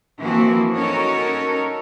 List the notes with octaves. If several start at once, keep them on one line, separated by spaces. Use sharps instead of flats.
E3 F3 A#3 C4 E4 F#4
C#4 D#4 F#4 A4 A#4 C#5